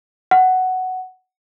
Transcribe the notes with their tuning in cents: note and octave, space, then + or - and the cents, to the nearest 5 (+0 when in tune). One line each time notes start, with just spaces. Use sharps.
F#5 +5